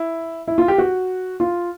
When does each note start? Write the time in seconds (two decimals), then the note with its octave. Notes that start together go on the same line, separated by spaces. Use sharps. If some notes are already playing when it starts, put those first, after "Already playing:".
Already playing: E4
0.48 E4
0.58 F4
0.68 G4
0.78 F#4
1.40 F4